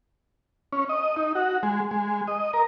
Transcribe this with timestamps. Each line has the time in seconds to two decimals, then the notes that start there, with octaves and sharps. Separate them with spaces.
0.73 C#4
0.89 D#5
1.16 D#4
1.35 F#4
1.63 G#3
1.91 G#3
2.27 D#5
2.53 A#4